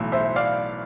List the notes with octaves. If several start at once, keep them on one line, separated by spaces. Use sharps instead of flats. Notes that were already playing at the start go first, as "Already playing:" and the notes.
Already playing: B1 A2 E3
C5 E5
D5 F5